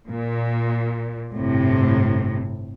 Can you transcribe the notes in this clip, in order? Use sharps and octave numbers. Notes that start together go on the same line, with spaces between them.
A#2
G1 A2 C3